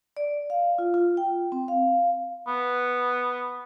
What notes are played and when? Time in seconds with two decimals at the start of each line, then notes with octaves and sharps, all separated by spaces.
0.17 D5
0.50 F5
0.78 F4
0.94 F4
1.17 G5
1.52 C4
1.68 F5
2.47 B3